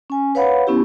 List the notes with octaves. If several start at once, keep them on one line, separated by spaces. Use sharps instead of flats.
C#4 G#5
B4 C#5 F5 F#5 B5
B3 C#4 E4 G4